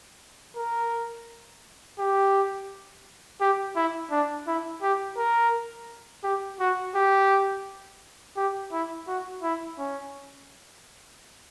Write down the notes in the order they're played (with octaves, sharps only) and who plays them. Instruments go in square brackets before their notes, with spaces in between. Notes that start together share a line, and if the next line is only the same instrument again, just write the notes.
[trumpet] A#4
G4
G4
E4
D4
E4
G4
A#4
G4
F#4
G4
G4
E4
F#4
E4
C#4